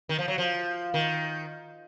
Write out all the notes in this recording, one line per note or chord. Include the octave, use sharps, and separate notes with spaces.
D#3
F3
F#3
F3
D#3